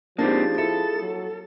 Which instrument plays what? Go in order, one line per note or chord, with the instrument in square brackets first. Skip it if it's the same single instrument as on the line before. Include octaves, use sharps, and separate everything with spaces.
[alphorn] F3 [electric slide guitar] A#3 C4 [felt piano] D4 D#4 G4 [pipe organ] G#4 A6
[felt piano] E4 [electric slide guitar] A4
[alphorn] F#3